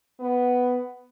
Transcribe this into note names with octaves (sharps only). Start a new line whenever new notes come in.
B3